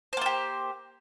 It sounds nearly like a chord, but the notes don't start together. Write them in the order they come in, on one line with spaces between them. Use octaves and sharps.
C5 A#3 F4 G4